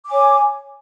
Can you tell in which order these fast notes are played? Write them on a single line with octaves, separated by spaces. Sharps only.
D6 G#5 C#5